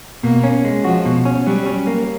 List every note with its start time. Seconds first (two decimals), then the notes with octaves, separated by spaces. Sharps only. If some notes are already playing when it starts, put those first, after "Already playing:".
0.23 B2 A#3
0.44 C#4
0.65 G#3
0.84 F3 F#4
1.05 B2
1.25 C#4
1.47 F#3 G3
1.66 C#4
1.87 A#3